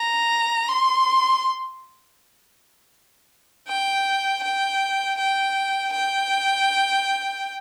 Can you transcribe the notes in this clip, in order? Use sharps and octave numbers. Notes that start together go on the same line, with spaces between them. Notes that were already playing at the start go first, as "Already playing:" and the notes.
Already playing: A#5
C6
G5
G5
G5
G5